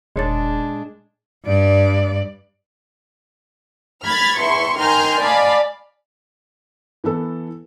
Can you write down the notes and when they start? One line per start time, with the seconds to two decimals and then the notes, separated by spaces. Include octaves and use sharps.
0.16 E1 A#2 G#3 D4 G#4 C#5 A6
1.45 G2 D5
4.04 B5 F6 G#6 A6 B6
4.38 E2 E4 C6 C#6 C#7
4.77 D#3 A#4 G#5 C6 F6 G6
5.21 D5 D#5 F5 G#5 A5 B5
7.04 E3 B3 A4